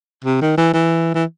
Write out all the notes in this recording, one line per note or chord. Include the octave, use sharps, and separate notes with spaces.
C3
D#3
E3
E3
E3